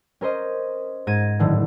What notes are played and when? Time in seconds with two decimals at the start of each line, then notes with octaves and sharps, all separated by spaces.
0.21 C#4 A#4 C5 D#5
1.07 G#2 G#6 A#6 D#7
1.39 F#1 A2 D3 D#3